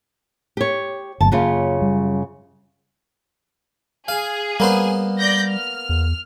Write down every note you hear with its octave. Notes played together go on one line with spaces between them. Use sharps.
G4 C#5
G1 F#3 A#3 A5
F#2 C#3 A#3 F4
G3
G#4 F5
G3 A#3 B3 C5
D5 G6 A#6
F6
E2